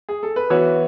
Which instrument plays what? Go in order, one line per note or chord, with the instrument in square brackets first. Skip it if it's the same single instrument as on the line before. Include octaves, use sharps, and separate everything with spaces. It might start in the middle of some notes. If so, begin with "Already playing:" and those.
[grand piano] G#4
A4
B4
[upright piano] E3 B3 F#4 [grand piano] C#5